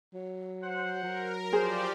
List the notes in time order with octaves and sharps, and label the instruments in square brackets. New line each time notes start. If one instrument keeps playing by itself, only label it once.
[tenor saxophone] F#3
[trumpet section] C5 F#5
[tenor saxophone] F#3 [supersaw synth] A#4
[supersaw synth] F3 G4 D5 [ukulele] G#4 [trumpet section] C5